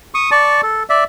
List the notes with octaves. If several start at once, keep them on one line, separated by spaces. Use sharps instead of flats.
C#6 D#6
D5 A5 C#6
A4
D5 E5